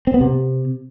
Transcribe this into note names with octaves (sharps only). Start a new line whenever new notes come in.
C4
B3
C3